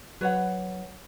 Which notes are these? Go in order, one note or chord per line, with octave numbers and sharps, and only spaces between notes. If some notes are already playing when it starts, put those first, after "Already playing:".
F#3 B4 C#5 F#5